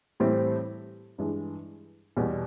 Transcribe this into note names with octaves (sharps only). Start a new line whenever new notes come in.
A2 E3 G3 C4
G2 E3 G#3
E2 B2 G3